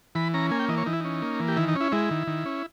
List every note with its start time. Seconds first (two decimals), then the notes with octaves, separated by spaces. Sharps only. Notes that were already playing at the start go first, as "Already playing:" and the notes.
0.15 E3 B5
0.34 C#4 A#5
0.51 A#3 G#5
0.59 G5
0.68 E3 D#5
0.78 C#5
0.86 E3 D#4
0.93 E4
1.01 C#4 D#4
1.22 A#3
1.40 E3
1.48 G4
1.57 D#3 E4
1.68 D#4
1.75 C#4
1.81 E4
1.92 G#3 E4
2.11 D#3
2.27 D#3
2.46 C#4